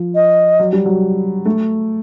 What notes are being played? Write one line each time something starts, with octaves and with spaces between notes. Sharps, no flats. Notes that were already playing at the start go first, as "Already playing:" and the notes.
Already playing: F3
D#5
F#3
G3
F#3
A3